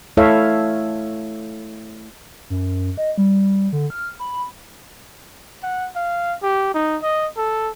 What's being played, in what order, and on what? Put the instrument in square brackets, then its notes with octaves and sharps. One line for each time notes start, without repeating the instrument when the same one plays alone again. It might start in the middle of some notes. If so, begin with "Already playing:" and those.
[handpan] A3 E4 A4 C#5 E5 F5
[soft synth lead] F#2
D#5
G3
D3
F6
B5
[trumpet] F#5
F5
G4
D#4
D#5
A4